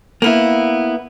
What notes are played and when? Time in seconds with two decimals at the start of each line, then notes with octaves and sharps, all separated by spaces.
0.22 A#3 B3 E4